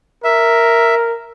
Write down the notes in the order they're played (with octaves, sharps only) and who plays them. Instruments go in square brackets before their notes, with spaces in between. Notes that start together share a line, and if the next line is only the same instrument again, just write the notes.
[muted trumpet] A#4 [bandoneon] E5